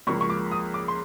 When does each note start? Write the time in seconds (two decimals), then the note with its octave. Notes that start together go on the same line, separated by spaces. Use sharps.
0.07 C#2 C#3 F3 A#3 C#6
0.21 C#6
0.30 D6
0.52 D#6
0.74 D6
0.88 C6